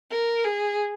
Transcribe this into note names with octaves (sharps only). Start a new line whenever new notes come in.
A#4
G#4